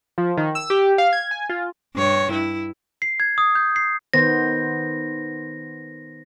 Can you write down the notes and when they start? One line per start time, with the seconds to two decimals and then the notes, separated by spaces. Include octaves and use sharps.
0.18 F3
0.37 D#3
0.55 E6
0.70 G4
0.98 F5
1.13 G#6
1.31 G#5
1.49 F4
1.96 G2 C#5
2.32 E4
3.02 C7
3.20 G#6
3.38 D#6
3.55 G6
3.76 C7
4.14 D#3 B3 C5 A#6